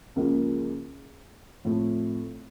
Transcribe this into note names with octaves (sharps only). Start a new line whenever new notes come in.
C#2 C#3 F3 A#3
A2 F3 A3 C4